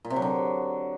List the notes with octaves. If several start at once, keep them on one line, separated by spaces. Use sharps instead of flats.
A#2
C3
F#3
D3